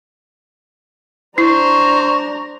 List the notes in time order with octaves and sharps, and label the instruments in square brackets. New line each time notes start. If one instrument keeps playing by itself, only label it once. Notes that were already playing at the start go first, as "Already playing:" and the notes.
[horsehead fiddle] D4 A#5 [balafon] E4 [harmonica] C5 [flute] C#6